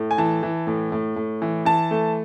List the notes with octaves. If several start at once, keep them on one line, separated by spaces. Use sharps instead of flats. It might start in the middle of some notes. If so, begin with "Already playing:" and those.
Already playing: A2
G#5
E3 A5
E3
A2
A2
A2
E3
E3 A5
A3